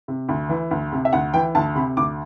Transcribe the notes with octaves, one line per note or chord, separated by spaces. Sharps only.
C3
D2
E3
D2
C3
E5
D2 F#5
E3 G5
D2 A5
C3 B5
D2 D6